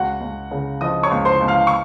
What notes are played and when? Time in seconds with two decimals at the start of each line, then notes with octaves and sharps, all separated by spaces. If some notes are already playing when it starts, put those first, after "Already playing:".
Already playing: C#2 F#4 F#5
0.21 C#2
0.51 C#3
0.81 F3 D#5 D#6
1.03 C#5 C#6
1.11 C#2
1.25 C5 C6
1.41 C#2
1.48 F5 F6
1.67 C#6